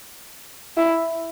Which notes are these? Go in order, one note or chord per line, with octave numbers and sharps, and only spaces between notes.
E4